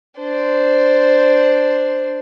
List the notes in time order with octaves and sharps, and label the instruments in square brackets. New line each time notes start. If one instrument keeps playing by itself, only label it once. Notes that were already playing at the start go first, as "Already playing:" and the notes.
[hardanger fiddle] D4 C5